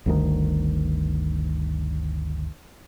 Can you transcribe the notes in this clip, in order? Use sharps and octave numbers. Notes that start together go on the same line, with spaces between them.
G1 D2 D#3